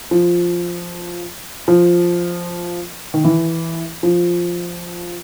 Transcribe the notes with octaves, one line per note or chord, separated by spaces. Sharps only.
F3
F3
D#3
E3
F3